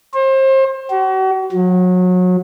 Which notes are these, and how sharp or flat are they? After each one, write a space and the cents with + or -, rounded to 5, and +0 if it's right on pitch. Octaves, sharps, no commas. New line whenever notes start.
C5 +30
F#4 +40
F#3 -30